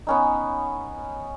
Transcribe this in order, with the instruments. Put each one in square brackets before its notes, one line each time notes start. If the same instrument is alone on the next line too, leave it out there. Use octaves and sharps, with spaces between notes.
[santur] B3 C#4 D#4